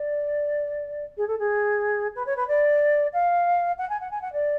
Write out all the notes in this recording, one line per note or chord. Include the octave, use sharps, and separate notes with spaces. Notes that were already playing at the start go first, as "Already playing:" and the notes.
Already playing: D5
G#4
A4
G#4
B4
C#5
B4
D5
F5
F#5
G#5
F#5
G#5
F#5
D5